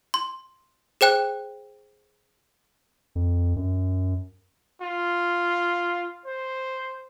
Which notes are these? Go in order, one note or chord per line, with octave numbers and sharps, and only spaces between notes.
C6
G#4 C5 G5 F#6
F2
F#2
F4
C5